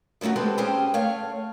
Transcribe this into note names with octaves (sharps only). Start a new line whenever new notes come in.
F3 G3 A3 D#4 F#4
G#3 C4 G4 A4 B4
C4 C#4 G4 G#4 C5 G5
A3 C#5 F5